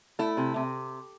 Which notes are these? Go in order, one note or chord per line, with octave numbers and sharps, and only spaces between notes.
A3 E4
C3
C3